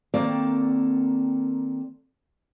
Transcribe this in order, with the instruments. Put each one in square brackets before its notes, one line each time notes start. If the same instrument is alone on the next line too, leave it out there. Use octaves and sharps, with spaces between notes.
[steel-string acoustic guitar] D#3 A#3 C4 A4 D5